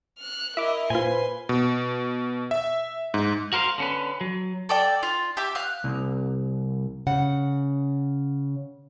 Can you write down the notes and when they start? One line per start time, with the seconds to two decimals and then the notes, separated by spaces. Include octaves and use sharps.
0.19 F6 F#6
0.57 E4 A#4 D#5 E5 D6
0.90 A#2 F4 B4 C5 G#5 C6
1.49 B2
2.51 E5
3.14 G#2
3.53 F#4 A#4 C5 F5
3.78 D3 C#4 B4
4.21 F#3
4.69 A4 D5 G5
5.03 F4
5.37 G4 E5 D6
5.55 F5 F#6
5.84 C2
7.07 C#3 F#5